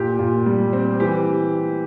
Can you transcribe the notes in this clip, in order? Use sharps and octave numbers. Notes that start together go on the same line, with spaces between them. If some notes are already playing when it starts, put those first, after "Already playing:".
Already playing: A#2 G4
A#2
G3
C4
E3 G4